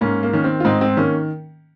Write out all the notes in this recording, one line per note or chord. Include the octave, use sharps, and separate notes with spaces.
G#2 A#3 C#4
A#3
D#3 C#4
C4
F4
G#2 C4 D#4
C4
D#3 A#3 C#4